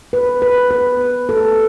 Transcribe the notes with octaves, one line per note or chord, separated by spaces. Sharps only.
B4
B4
B4
A4